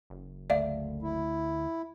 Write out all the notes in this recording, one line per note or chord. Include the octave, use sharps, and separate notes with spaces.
F#1
D2 A3 D5 E5 F5
E4